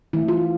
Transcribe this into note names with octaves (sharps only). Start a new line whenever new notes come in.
E3 A3 E4
F4